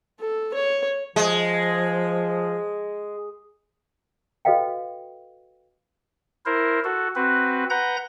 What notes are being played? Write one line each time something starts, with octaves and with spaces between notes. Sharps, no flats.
A4
C#5
F3 G#3
F#4 A4 B4 D#5 F5 G5
E4 A#4 C5
F#4 A4
C4 F#4 B4
B4 F#5 A#5 G6 A#6